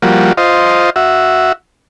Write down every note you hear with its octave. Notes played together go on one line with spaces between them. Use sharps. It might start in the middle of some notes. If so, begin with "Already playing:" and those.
F3 G3 A#3 F#4
F4 C5 D#5
F#4 E5